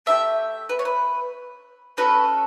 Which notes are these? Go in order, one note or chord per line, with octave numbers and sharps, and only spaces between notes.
A3 D4 G4 E5
B4
C#5
B4
A3 C#4 F#4 A4 B4